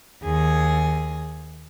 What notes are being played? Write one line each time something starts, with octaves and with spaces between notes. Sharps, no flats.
D#2 G#4